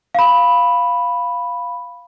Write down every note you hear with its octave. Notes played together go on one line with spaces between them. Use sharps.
F5 B5